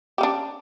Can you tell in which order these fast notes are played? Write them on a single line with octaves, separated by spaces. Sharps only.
G4 C#4 D4